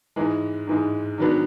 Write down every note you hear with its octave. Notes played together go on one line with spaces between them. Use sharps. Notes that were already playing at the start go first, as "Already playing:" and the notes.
G#2 E3 G#3
G#2 E3 G#3
G#2 D#3 F#3 B3 D4